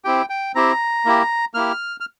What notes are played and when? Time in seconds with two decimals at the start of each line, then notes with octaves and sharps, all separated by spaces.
0.05 C4 E4 G4 G5
0.30 G5
0.55 C4 E4 G4 A#5
1.05 A#3 E4 G4
1.54 A#3 E4 G4 F6
2.00 F6